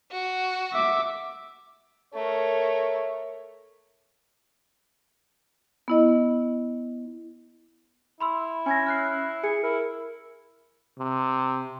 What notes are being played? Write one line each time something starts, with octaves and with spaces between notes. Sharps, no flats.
F#4
E5 D6
A3 A#4 C#5
B3 E4 D#5
E4 B5 C6 E6
C#4 G#5 G#6 A#6
F6 F#6 C7
G#4 C#7
E4 A#4
C3